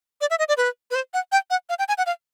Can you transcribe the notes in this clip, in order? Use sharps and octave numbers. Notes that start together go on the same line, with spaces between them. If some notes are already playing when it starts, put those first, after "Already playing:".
D5
E5
D#5
D5
B4
B4
C5
F#5
G5
F#5
F5
G5
G#5
F#5
F5